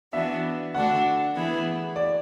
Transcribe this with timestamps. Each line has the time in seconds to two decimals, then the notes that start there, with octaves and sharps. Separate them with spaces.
0.13 E3 B3 D4 F#4 E5
0.74 D3 A3 D4 F#4 F#5
1.35 E3 B3 E4 G#4
1.96 D5